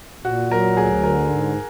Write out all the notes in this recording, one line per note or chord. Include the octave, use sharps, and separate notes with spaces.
A#2 F#4
F#3 A#4
D2 G#4
D3 A#4
G#2